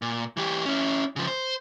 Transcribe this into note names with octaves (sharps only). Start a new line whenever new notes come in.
A#2
E3 G4
C#4 E4
C#3 F3
C5